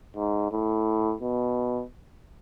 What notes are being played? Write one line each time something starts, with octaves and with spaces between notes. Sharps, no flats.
G#2
A2
B2